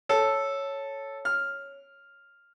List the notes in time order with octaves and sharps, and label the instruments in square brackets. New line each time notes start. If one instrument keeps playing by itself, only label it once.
[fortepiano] A4 [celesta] C#5
[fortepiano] F6